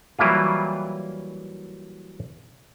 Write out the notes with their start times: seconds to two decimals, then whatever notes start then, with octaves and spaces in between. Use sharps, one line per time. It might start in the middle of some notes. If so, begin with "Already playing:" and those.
0.19 E3 F#3 G3 A#3 E4 F4